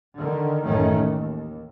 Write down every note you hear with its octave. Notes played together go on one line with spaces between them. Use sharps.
D3 D#3
A1 F#2 D#3 A3 C#4
D#2